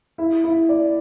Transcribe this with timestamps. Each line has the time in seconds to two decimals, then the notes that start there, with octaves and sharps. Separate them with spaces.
0.18 E4
0.44 E4
0.69 D5